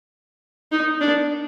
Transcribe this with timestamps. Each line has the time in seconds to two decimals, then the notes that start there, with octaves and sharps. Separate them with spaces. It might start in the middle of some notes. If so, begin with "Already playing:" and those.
0.72 D#4
1.01 D4